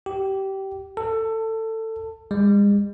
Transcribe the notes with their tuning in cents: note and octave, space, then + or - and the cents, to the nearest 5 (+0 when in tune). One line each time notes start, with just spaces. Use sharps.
G4 -20
A4 +20
G#3 -40